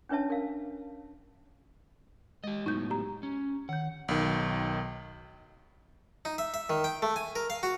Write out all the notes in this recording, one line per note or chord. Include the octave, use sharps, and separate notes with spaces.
C#4 D4 B4 C#5 E5 A5
A#4 F5
G#3 G4 D#5
A2 F#3 B3 D#4 G6
G4 A#5
C#4
D#3 F#5 G6
B1 D#3
D#4
E5
E5
D#3
G5
A3
G#5
A#4
F5
F#4